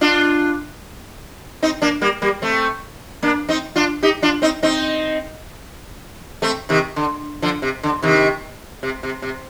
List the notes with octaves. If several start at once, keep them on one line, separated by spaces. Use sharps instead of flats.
D4 F4
C4 D#4
A#3 D4
G3 A#3
G3 A#3
A3 C4
A#3 D4
C4 D#4
D4 F4
D#4 G4
D4 F4
C4 D#4
C4 D#4
A3 C4
C3 D#3
D3
D3 F3
C3
D3
C3 D#3
C3
C3
C3